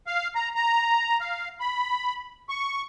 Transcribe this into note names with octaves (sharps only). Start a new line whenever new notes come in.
F5
A#5
A#5
F5
B5
C#6